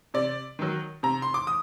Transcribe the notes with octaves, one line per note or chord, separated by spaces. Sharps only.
C3 D5
D#3 F#3
C3 A#5
C6
D6
D#6